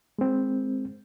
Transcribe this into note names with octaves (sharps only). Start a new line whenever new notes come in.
G#3 C4